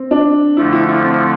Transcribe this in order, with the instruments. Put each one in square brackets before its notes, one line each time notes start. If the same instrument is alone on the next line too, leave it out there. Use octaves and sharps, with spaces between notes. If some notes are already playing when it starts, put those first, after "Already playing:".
Already playing: [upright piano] C4
D4
[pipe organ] F2 D3 F3 A3 [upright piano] E4
[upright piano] E4
E4
C4